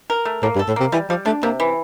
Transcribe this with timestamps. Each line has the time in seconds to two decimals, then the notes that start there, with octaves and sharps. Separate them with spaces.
0.10 A#4
0.25 A3
0.43 A2 A#3
0.55 G2
0.59 A4
0.68 A2
0.76 C3 A#3
0.92 E3 G3
1.10 F3 G3
1.26 A3 D4
1.43 C3 A#3
1.60 E3